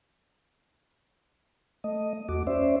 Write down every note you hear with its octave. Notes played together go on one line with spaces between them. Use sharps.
A3 D#5
E2 A3 F#4 D6
C#4 C5 D5 E5